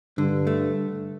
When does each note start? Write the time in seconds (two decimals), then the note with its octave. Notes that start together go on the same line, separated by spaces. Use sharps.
0.18 G2 D3
0.47 A3